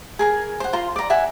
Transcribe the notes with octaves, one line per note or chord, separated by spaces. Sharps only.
G#4 A#4 G#5
C5 F#5
F4 A#5 C6
D5 A#5
E5 F#5 G#5